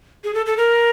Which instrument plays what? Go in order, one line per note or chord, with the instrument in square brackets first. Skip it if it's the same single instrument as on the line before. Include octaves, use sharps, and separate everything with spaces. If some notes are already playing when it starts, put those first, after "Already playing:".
[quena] G#4
A4
A4
A#4